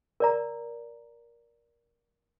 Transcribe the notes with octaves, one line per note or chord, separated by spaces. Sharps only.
A#4 D5 A#5